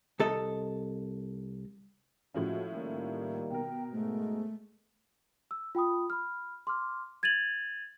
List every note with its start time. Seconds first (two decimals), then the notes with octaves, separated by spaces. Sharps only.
0.20 C2 A4 D#5
2.34 A2 F3 G#3 A#3 C#4 F#4
2.72 D#3 G3 A#3
3.50 B2 A#4 G5
3.92 G#2 G#3 A3
5.51 E6
5.75 F4 G5 B5 D#6
6.10 B5 F6
6.67 C6 D6 F6
7.23 G#6 A6 D#7 F7 F#7